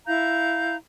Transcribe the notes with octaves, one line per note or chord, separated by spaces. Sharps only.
E4 F5 A#5 G6